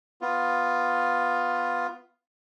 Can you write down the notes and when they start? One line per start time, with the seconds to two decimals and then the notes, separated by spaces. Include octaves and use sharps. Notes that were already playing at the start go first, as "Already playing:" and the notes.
0.21 B3 F4